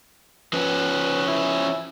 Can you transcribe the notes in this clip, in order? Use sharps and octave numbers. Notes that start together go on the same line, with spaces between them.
F3 C#4 B4
E4